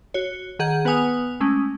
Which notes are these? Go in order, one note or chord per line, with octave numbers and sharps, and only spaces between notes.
F#4 C#5
D#3 G#4 F#5 G6
B3 B4 F#5 G#5 D#6 F7
G#3 A3 C#4